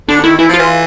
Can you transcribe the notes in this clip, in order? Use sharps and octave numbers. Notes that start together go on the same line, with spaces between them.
D3 D4
D#3 E4
E3 E4
F3 F4
E3